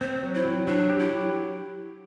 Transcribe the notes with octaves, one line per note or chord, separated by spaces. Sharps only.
C4 C5
F#3
E4
F#3
F#3 D4
G4
E4
F#3